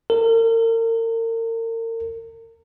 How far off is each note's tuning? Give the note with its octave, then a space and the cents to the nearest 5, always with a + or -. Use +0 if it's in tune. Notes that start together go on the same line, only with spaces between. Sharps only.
A#4 -40